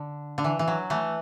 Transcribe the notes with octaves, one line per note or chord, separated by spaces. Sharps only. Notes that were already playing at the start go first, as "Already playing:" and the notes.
Already playing: D3
D3
E3
E3
F#3
E3 A3